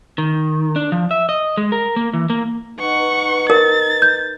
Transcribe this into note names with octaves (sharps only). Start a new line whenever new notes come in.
D#3
D4
F3
E5
D#5
G#3
A#4
A#3
E3
A#3
D#4 B4 F#5 C#6
A#4 A6
G6